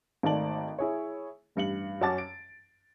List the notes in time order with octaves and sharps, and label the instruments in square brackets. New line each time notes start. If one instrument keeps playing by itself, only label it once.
[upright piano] G#1 D#3 A3 D5 A5 F#7
E4 G#4 C#5
A1 G2 C#7 F#7
F#2 C#4 F#5 A5 D6 A6
D7